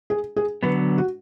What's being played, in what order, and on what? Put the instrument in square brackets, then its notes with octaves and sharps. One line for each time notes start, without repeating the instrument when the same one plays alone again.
[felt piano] G#4
G#4
[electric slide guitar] D3 F#3 B3 [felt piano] B4
[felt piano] F#4